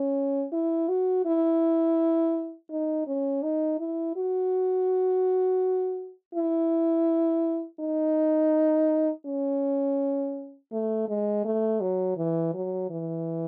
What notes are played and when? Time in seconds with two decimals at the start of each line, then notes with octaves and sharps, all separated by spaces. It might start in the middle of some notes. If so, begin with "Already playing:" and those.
Already playing: C#4
0.53 E4
0.89 F#4
1.25 E4
2.70 D#4
3.07 C#4
3.43 D#4
3.80 E4
4.16 F#4
6.35 E4
7.80 D#4
9.26 C#4
10.72 A3
11.08 G#3
11.45 A3
11.81 F#3
12.17 E3
12.54 F#3
12.90 E3